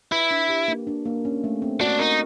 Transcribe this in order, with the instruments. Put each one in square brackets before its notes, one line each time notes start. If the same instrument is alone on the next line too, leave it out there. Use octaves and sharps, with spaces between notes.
[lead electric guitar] E4 [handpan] B4
[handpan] D4
G4
A#3
D4
A#3
C#4
A3
C4
[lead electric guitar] D4 [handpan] F#4
[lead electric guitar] D#4 [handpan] A#4